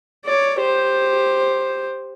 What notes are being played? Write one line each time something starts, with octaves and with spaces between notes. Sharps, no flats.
C#5 D5
G4 C5